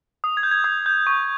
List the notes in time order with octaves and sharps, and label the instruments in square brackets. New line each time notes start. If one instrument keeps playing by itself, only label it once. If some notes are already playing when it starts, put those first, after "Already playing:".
[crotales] D#6
G#6
G6
G#6
D#6 G#6
G6
C#6